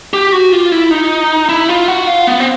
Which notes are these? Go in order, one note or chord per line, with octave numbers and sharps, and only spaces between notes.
G4
F#4
F4
E4
D#4
E4
F4
F#4
F4
B3
C4